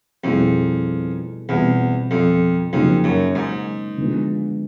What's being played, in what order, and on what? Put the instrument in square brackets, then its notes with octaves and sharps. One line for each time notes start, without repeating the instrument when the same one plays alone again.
[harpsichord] F2 [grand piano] B2 G3 B3 E4 G#4
[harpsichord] E2 [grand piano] B2 G3 C4 F4
[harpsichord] F2
[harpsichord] F2 [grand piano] C#3 F#3 A#3 D#4 G#4
[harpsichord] F#2
G#2
[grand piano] D3 F3 G#3 B3